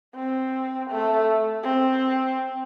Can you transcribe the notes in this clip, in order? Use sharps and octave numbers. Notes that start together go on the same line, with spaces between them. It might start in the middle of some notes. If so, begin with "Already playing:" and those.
C4
A3
C4